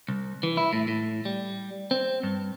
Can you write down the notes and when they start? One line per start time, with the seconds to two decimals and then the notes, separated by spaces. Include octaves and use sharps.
0.09 C2
0.43 E3
0.57 E4
0.73 A2
0.88 A2
1.25 G3
1.91 C4
2.23 G2